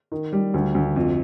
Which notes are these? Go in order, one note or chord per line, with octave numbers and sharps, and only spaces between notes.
D#3
G3
D2
D2
F2